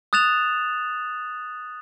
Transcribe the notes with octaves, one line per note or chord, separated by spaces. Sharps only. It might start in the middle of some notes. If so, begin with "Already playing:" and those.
D#6 F#6 A6 E7 F7